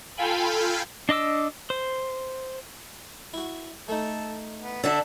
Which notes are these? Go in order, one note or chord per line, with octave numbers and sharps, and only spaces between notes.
F4 A4 F5 G5 G#5 B5
D4 D#5 D6 E6
C5
E4 F#4
A3 D#4 A4
B3
D3 D4 A4 E5 F#5